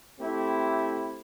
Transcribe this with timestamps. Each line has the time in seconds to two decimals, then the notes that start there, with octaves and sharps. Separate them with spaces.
0.20 A3 C4 E4 G4